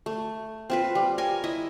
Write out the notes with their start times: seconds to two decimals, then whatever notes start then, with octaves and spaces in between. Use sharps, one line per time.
0.06 A3
0.70 C4 F4 B4
0.95 G3
1.18 A#4 C#5 G#5
1.44 E4 D#5